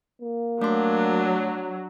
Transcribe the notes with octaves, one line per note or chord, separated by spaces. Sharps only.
A#3
F#3 A3 D4 C6